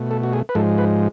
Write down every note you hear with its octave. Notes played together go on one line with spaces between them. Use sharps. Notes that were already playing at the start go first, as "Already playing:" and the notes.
Already playing: B2 A3
A4
F#4
G#4
B4
G#2 F3 G#3 A4
B4